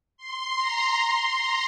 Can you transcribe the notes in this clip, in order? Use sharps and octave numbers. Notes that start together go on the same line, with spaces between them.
C6
A#5
C6
A#5